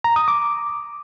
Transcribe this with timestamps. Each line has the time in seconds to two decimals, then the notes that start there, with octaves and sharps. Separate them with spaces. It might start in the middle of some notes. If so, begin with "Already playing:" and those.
0.04 A#5
0.16 D#6
0.28 D6